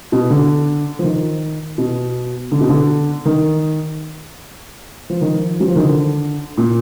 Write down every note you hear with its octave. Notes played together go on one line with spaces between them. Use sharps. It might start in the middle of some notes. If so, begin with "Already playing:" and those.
B2
D3
F3
D#3
B2
D3
B2
D3
D#3
F3
D#3
F3
F#3
F3
D#3
D3
A#2